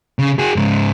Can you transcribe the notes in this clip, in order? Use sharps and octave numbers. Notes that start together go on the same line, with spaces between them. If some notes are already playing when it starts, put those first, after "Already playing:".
C#3
F#4 G#4
G#2 C#3